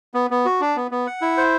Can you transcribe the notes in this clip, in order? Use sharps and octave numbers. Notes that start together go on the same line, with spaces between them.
B3
B3
F#4
D4
B3
B3
F#5
E4
C5